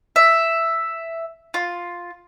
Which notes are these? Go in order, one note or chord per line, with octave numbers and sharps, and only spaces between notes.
E5
F4